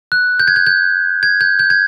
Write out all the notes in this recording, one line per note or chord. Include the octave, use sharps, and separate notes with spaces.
F#6
G6
G#6
G6
G6
G#6
G6
G6
G#6